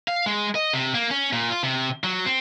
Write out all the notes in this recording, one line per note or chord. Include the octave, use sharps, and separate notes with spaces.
F5
G#3
D#5
C3
A#3
C#4
A#2
F4
C3
F#3
C4